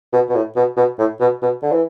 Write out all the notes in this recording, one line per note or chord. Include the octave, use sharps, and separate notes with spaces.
B2
B2
A2
B2
B2
A2
B2
B2
D3
E3